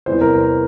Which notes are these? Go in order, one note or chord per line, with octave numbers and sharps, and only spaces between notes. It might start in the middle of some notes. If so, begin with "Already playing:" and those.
E2 C3 E3 G3 C5
A#4
C5